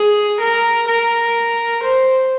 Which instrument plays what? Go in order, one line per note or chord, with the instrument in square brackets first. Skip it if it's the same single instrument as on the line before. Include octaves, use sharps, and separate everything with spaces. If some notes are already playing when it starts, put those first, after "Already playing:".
Already playing: [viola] G#4
A#4
A#4
C5